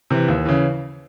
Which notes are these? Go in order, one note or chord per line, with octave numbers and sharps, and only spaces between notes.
C3 E3
D#2
C#3 E3